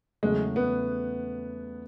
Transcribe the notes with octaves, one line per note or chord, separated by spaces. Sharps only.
E2 C#3 F#3 G#3 A3
B3